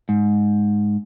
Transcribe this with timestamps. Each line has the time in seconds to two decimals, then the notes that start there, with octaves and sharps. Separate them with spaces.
0.09 G#2